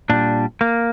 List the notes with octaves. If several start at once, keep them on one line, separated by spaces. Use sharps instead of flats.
A#2 G3 D4
A#3